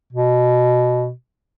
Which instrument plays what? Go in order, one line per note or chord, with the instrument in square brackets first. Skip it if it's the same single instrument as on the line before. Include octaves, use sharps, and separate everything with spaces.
[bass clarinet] B2